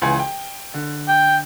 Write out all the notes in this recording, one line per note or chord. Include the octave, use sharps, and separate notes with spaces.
C#2 E3 G#5
G5
D3
G5